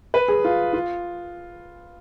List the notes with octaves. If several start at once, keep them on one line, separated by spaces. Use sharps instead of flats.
B4
G#4
F4
F4